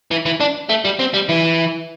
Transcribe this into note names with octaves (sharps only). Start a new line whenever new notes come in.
E3
E3
D4
A3
G3
C4
G3
E3